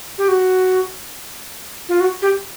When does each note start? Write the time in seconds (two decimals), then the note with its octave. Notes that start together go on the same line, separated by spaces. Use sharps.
0.18 G4
0.28 F#4
1.89 F4
2.00 F#4
2.22 G4